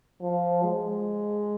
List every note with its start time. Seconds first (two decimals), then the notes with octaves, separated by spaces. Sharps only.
0.21 F3
0.63 G#3